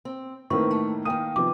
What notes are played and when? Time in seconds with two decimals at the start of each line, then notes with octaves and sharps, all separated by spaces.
0.05 C4
0.50 A2 D#3 A#3 C4 B4 C#6
0.71 A3
1.05 D#3 A#3 G5 D#6 D#7
1.36 C3 F3 B3 D6